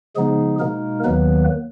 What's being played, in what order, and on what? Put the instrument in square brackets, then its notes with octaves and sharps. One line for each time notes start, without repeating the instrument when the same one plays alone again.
[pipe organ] C#3 F3 G#3 B3 D#4 G#4
B2 G#3 A#3 D#4 A#4
D#2 D#3 F#3 A#3 B3 B4